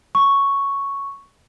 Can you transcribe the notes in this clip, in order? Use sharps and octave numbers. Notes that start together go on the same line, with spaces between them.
C#6